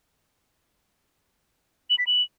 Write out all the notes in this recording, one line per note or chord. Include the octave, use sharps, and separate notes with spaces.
F#7
B6
F#7